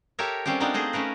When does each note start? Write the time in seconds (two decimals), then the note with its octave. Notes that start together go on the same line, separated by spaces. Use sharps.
0.19 G4 A4 A#4 C#5 E5
0.46 G3 C4 C#4 F4 G4
0.60 B3 C4 D4 D#4 F4 A#4
0.74 A3 G#4 C5 D#5
0.93 A3 C#4 A#4 B4